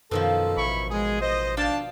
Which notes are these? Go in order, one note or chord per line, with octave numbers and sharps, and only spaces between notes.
F#2 B2 D#3 F3 A4
A1 E4 B5 C#6
G#3 G#4
C5 D#5
D4 D5 F5 G5 A5